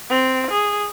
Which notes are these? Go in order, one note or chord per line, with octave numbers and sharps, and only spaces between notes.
C4
G#4